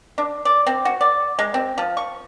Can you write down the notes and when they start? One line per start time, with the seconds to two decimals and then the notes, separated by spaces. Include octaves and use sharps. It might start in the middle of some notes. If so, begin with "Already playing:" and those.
0.18 D4
0.45 D5
0.67 C4
0.85 F#4
1.01 D5
1.39 G#3
1.54 C4
1.78 F3
1.97 C#6